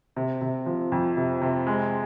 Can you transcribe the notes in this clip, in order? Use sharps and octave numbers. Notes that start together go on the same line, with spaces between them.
C3
C3
F3
F2
C3
C3
G#3